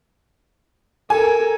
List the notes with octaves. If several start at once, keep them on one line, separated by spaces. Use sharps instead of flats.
A4 A#4 G#5